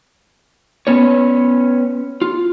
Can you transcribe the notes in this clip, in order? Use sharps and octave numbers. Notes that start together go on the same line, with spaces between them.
B3 C#4 C#5
F4